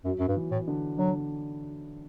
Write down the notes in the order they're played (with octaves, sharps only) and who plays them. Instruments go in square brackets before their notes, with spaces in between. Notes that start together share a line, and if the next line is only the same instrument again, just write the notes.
[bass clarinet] F#2 [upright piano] F#3
[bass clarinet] F#2
G2
[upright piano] E3
[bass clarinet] A2
[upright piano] D3
[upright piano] D3 [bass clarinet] F#3